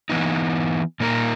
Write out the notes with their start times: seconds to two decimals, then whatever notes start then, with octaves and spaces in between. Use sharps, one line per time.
0.10 E3 B3 D#4
1.00 A#2 A#3 D#4 A#4